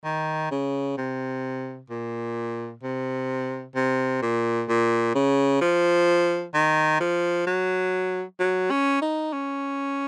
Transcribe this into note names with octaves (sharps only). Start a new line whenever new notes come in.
D#3
C#3
C3
A#2
C3
C3
A#2
A#2
C#3
F3
D#3
F3
F#3
F#3
C#4
D#4
C#4